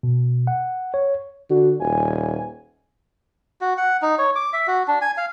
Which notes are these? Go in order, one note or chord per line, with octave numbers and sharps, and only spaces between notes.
B2
F#5
C#5
D3 F#4
D#1 G#5
F#4
F#5
D#4
C#5
D6
E5
F#4
D4
G#5
F5